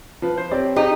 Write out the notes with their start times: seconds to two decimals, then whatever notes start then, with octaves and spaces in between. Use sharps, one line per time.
0.22 F3 B4
0.37 C5
0.51 C4 G4 C#5 D5
0.76 D#4 G4 G#4